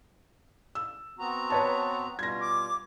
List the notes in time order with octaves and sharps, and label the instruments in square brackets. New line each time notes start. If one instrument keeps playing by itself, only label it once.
[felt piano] E6
[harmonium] B3 C4 F#4 [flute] A#5
[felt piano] B4 C#5 A5
[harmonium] B2 G3 F4 [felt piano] G#6 A#6
[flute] D6